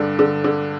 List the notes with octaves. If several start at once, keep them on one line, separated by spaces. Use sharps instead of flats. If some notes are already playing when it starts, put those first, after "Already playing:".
Already playing: G2 D3
D3
D3